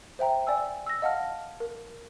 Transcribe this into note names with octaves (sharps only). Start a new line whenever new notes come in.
C5 E5 G5 A#5
D5 G5 G#5 E6
E6 A#6
D#5 F5 F#5 A5 F6
A#4